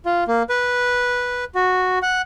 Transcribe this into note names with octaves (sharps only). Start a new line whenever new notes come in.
F4
A#3
B4
F#4
F#5